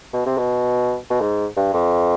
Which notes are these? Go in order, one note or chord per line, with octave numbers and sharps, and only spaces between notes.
B2
C3
B2
B2
G#2
G2
F2